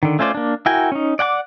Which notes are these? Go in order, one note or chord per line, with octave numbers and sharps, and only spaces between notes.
D3 D#3
A3 C#4 F4 C5 D5
A#3 D4
E4 F#4 A#4 G5 G#5
C#4 D#4
D5 F#5 G5 D6